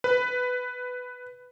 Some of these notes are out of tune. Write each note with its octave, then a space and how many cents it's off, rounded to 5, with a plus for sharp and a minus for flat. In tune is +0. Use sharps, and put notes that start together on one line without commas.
B4 +10